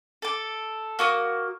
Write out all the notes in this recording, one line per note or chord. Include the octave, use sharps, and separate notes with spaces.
A4 D6
A#3 F#4 D#6